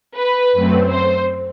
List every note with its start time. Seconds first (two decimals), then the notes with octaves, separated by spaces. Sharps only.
0.17 B4
0.53 F#2 F#3 A3 C4
0.90 C5